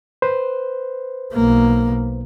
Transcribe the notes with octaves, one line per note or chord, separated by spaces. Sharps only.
B4 C5
B1 A#3